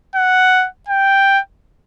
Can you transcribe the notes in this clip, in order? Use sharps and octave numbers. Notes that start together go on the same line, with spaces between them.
F#5
G5